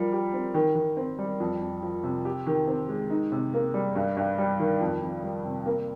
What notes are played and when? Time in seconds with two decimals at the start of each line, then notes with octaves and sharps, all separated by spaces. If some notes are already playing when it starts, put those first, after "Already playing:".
Already playing: F3 G3 A#4
0.12 G4
0.33 C4
0.54 D#3
0.75 D#3
0.97 C4
1.19 G3
1.40 F2
1.61 F2
1.83 F3
2.03 C3
2.25 G4
2.47 D#3
2.67 C4
2.89 G#3
3.10 D#4
3.32 C3
3.54 A#3
3.74 G3
3.95 G2
4.17 G2
4.38 G3
4.60 D#3
4.80 F2
5.01 F2
5.23 G3
5.45 C3
5.66 A#3